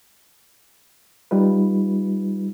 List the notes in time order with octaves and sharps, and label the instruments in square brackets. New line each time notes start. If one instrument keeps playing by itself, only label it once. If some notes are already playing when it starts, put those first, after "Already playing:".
[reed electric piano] G3 D#4 F4 B4